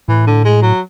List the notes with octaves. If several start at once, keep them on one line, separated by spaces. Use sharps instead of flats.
A2 E3
D3
G#3
F#3